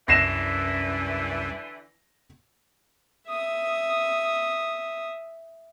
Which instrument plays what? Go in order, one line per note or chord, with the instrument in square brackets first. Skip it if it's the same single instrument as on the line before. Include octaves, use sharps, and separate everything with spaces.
[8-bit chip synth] C2 F#2 [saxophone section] D3 E3 [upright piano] A#6 C7 E7
[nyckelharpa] E5 D#6